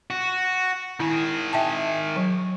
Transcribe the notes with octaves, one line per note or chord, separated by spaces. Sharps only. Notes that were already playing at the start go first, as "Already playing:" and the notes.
F#4
D#3 E4 G#4
E5 G5 A5
F#3